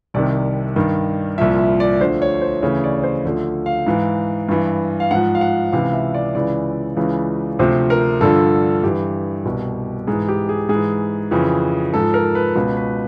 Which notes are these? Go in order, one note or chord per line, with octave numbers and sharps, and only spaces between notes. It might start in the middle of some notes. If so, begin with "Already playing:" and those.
C2 C3 D#3 D5
G2 D#3
C2 A#2 F3 E5
E5
D5
D2 D3 F3 C5
C#5
C5
D2 C#3 E3 C#5
D5
C#5
C5
D2 D3 F3
F5
G#2 E3
G2 E3
F5
G#2 F3 F#5
F5
F#5
C#2 C3 E3 F5
E5
D5
C#2 C#3 E3 D5
C#2 C#3 E3
D2 C3 F3 C5
A#4
G2 D3 F3 A4
G2 E3 G4
C2 B2
G#2 E3 G#4
G4
G#4
G#2 G#4
E3
F2 C#3 E3
G#2 F3 A4
A#4
B4
C#2 B2 B4
B4